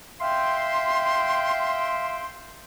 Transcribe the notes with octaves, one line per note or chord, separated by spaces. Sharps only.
E5 F5 G5 C6